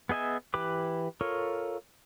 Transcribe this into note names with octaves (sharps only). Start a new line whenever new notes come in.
B3 G#4 D#5 E5 G#5
E3 G4 B4 B5 D6
F4 A4 A#4 C#5